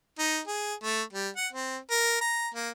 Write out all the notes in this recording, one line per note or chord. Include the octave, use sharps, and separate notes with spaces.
D#4
G#4
A3
G3
F#5
C4
A#4
A#5
A#3